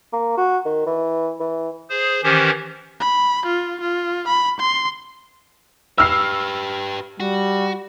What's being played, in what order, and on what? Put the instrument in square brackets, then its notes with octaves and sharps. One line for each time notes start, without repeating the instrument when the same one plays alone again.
[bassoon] A#3
F#4
D#3
E3
E3
[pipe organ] G#4 C5
D#3 E3 C#4 G4 C5
[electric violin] B5
F4
F4
B5
C6
[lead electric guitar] G4 B4 [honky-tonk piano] E6 F6 C7
[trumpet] G3 [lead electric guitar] F#4